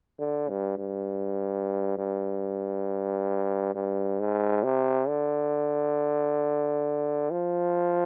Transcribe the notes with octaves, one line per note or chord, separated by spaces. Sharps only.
D3
G2
G2
G2
G2
G#2
C3
D3
F3